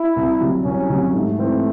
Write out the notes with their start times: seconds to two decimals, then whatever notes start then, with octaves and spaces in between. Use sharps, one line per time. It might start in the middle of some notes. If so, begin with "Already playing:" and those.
Already playing: E4
0.16 C2
0.40 C3 F#3
0.64 C2 C#4
0.89 C3 F#3
1.14 G#2 A3
1.38 E3 C4